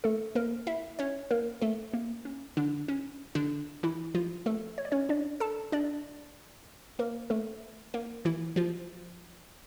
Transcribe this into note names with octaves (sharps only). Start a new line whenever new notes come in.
A3 A4
A#3 A#4
E4 E5
C#4 C#5
A#3 A#4
A3 A4
A#3
C#4
D3 D4
C#4
D3 D4
E3 E4
F3 F4
A3 A4
C#5
D5
C#4 C#5
D4 D5
A4 A5
D4 D5
A#3 A#4
A3 A4
A#3 A#4
E3 E4
F3 F4